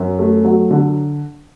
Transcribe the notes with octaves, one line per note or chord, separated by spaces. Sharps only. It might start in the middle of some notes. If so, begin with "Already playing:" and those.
Already playing: F#2
A3
F#3
D3